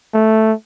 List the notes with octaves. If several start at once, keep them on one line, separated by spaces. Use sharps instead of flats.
A3